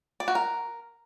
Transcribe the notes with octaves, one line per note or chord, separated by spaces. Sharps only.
D5
F#4
A#4